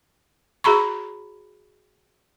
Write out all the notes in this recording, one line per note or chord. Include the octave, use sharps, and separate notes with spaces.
F#4 G#4 A#5 B5 C#6